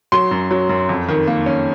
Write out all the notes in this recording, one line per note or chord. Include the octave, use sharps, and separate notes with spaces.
F#3 C6
F#2
F#3
F#2
F2
D#3
A#3
C#4